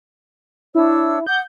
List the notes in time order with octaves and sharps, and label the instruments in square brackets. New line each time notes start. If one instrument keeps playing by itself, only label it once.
[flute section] D4 C#5 E6 [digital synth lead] E4
[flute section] F#5 D6 D#6 [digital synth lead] G6